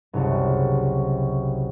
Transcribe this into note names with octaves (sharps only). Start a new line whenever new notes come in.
F#1 C2